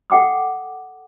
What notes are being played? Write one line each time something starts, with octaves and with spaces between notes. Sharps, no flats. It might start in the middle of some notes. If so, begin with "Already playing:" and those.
A4 F#5 G5 D6 D#6